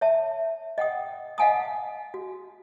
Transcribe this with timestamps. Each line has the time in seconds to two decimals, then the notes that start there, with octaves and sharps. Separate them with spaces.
0.01 C#5 E5 A5
0.78 D#5 F#5 G5 D#6
1.38 D#5 F5 F#5 G#5 A5 D#6
2.14 F#4